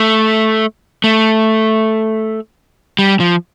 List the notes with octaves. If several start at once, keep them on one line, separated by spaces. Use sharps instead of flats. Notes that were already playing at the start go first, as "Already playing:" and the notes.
Already playing: A3
A3
G3
F3